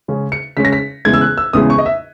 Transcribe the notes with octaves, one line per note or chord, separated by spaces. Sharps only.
C#3 G#3 C#4
C#7
C#3 G#3 C#4 B6
A#6
B6
E2 C#3 E3 G#3 G#6
E6
F#6
E6
E2 C#3 E3 G#3 D#6
C#6
D#5
E5